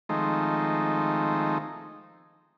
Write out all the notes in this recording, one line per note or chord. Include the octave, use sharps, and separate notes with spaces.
D#3 F3 G#3 A3 C4 D#4